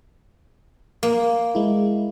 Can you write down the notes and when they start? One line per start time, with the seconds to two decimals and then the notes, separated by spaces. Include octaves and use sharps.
1.03 A#3
1.55 G#3 E4